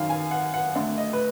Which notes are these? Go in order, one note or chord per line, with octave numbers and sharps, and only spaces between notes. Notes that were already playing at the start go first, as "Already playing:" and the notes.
Already playing: F#2 D#3 F5
G#5
F#5
F#5
D2 D3
D#5
B4